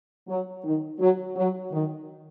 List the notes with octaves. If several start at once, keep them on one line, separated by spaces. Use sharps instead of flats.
F#3
D#3
F#3
F#3
D#3